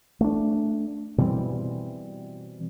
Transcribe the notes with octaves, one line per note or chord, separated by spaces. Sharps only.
A3 B3 D4
B2 E3 G3 C4